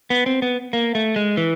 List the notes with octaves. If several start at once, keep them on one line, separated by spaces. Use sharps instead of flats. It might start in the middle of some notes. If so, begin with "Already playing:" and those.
B3
C4
B3
A#3
A3
G#3
E3